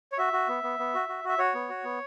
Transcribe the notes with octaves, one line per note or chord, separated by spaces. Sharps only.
C#5
F#4 E5
F#4
B3
B3
B3
F#4
F#4
F#4 E5
F#4 C#5
B3
F#4
B3